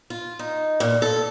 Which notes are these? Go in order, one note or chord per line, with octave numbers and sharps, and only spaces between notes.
F4
D#4
A#2
A4